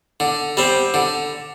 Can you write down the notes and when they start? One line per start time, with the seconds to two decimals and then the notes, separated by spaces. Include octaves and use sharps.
0.20 D3
0.57 G3 C4
0.94 D3